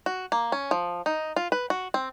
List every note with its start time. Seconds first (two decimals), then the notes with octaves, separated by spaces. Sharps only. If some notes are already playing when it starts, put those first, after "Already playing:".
0.06 F#4
0.32 A#3
0.52 C#4
0.71 F3
1.06 D#4
1.36 F4
1.52 B4
1.70 F#4
1.94 C4